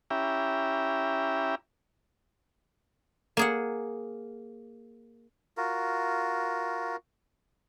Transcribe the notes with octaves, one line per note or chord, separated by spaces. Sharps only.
C#4 E4 G4 E5 G5 A#5
A#3 G#4 F#5
F4 F#4 A#4